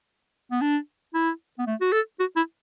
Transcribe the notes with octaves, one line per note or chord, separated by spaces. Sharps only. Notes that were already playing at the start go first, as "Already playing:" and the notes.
B3
D4
E4
B3
A3
F#4
A4
F#4
E4